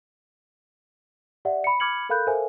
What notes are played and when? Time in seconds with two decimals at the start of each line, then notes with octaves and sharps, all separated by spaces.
1.45 G4 D5 E5 F#5
1.64 B5 C#7
1.80 B5 D6 F6 G#6 C#7 F#7
2.09 A4 A#4 F5 B5 F#6 G6
2.27 A4 A#4 C5 E5 F5 G#5